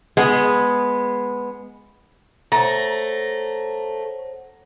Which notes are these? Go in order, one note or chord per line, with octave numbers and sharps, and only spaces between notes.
G#3 B3
A3 C5 C#5 F#5 A#5